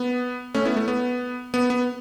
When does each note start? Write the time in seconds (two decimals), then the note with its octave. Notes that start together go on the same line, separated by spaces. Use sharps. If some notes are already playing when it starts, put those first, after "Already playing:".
Already playing: B3
0.54 A3 C#4
0.65 B3 E4
0.76 A3
0.88 B3
1.54 B3
1.70 B3